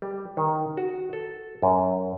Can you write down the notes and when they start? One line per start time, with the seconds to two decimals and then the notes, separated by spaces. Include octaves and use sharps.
0.02 G3
0.37 D#3
0.77 F#4
1.13 A4
1.62 F#2